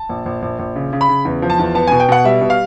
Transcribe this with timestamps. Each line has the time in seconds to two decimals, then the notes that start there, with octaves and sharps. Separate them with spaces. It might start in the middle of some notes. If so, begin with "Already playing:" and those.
Already playing: A5
0.09 A#1
0.26 A#1
0.42 A#1
0.59 A#1
0.76 C#3
0.93 C#3
1.01 B5
1.09 C#3
1.25 E2
1.42 F3
1.50 A5
1.59 E2
1.75 B3 A5
1.87 B2 G#5
2.00 G5
2.09 B2 F#5
2.24 G3 E5
2.41 B2
2.50 F5